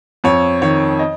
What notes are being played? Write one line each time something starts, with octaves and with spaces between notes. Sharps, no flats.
F2 C#5
D#3 C#5
D#5